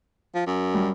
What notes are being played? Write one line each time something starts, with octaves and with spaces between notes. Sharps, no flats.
F3
F#2
G3